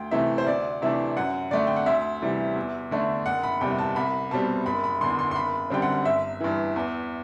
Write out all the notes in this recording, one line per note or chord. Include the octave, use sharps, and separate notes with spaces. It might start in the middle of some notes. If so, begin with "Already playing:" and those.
Already playing: D2 G5
C3 E3 A3 E5
C5
D2 D5
C3 E3 A3 D4 E5
F#2 F#5
D3 A3 D5
G5
F#5
D2 E5
C3 E3 G3
E2
D3 A3 D4
F#1 F#5
B5
E2 C3 G3 G5
A5
C2 B5
B2 G3 C4 A5
F#1 B5
B5
E2 D3 C6
C6
C6
F#1 B5
F#2 D3 G3 C4 G5
F#5
G1 E5
G2 E3
E2